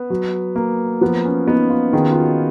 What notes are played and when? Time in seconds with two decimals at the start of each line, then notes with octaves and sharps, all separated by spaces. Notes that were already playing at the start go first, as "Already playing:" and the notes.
Already playing: B3
0.10 F#3
0.56 A#3
1.01 F3 B3
1.25 C#4
1.48 B3 D#4
1.70 F4
1.93 D#3 G#4
2.02 F#4
2.12 F4
2.21 F#4